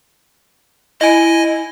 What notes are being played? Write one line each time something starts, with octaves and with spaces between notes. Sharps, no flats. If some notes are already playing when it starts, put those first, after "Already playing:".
E4 D#5 G#5